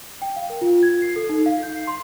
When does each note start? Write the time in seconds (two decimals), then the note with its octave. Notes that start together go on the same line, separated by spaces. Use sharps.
0.22 G5
0.36 F5
0.50 A#4
0.61 F4
0.83 G#6
1.02 C7
1.16 A4
1.29 D#4
1.46 F5
1.63 G6
1.76 C7
1.87 C6